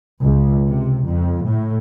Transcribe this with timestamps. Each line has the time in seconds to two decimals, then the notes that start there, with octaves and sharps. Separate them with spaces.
0.24 C#2
0.67 C3
1.07 F2
1.45 A2